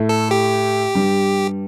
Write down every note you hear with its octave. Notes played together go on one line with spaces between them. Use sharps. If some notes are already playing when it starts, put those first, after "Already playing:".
Already playing: A2 A3
A4
G4
G2 G3